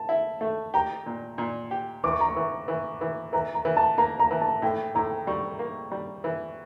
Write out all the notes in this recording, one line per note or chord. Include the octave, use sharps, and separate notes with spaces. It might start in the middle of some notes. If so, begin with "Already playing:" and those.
Already playing: A5
E4
A3
G4 A#5
A#2
A#2
G4
E3 D6
C#6
A#5
C#6
E3
E3
E3
E3 A#5
A#5
E3
A5
A#3 A#5
A#5
E3
A5
A2 G5
A2 A#5
G3 C#6
A#3
G3
E3